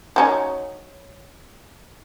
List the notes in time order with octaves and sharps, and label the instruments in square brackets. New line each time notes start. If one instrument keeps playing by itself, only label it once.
[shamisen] F#3 C#4 D#4